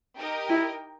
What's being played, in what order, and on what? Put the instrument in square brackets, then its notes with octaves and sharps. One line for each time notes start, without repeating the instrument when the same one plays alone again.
[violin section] D#4 G4 A#4 D#5 G5
[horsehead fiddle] E4